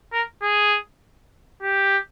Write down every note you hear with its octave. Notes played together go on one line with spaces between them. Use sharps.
A#4
G#4
G4